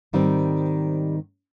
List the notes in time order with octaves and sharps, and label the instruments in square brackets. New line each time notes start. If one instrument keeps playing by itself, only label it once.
[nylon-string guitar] G#2 D#3 G3 C4